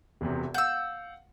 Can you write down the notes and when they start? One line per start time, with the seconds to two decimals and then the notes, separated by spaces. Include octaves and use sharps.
0.21 E1 E2 C3
0.54 F5 F#5 E6 G6